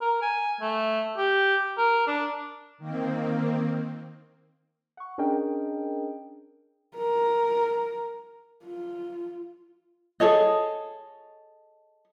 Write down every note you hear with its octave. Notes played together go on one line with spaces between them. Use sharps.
A#4
G#5
A3
G4
A#4
D4
D#3 A#3 C4
F#5 C#6
C#4 D4 G#4 A#4 D#5 G5
A#4
F4
G#4 A4 C#5 D#5